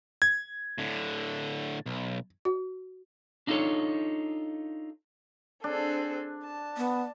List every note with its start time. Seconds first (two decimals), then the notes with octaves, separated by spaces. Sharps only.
0.22 G#6
0.78 A2 D3
1.86 B1
2.45 F#4
3.47 D4 D#4 F4 F#4 A4 C#5
5.64 C4 D4 G#4 A4
6.45 A5
6.77 B3